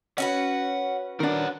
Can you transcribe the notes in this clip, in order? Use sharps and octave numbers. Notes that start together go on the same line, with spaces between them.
C#4 F#4 B4 F#5
D#3 D4 A#4 F#5